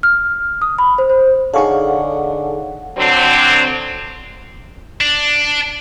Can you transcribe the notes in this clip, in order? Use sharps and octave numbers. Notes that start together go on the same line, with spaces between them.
F6
D#6
B5
C5
C5
D3 D#4 G#4 A4 C#5 F5 F#5 C#6
D3 F#3 C4
D4